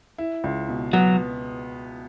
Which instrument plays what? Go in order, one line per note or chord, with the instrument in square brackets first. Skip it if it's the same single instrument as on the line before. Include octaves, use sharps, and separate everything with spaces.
[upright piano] E4
C#2
B2
[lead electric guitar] F#3 [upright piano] B3